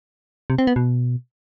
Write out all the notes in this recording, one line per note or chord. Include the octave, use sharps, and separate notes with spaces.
C3
C4
B3
B2